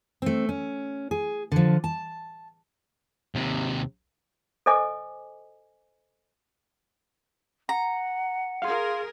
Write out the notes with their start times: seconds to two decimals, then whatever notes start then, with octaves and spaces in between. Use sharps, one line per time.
0.22 A3 C4
0.49 C#4
1.11 G#4
1.52 D3 F3
1.84 A5
3.35 D#2 C3
4.66 A4 C5 D#5 G#5 D6
7.69 F#5 A#5
8.62 G#4 A#4 F5 C6